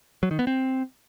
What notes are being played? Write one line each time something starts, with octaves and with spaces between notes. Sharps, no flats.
F#3
D#3
B3
C4